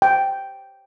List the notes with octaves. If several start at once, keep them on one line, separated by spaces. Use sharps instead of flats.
G5